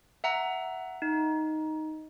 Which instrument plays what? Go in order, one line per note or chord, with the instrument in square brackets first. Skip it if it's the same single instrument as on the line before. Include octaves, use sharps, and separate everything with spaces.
[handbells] E5 F#5 A#5
D#4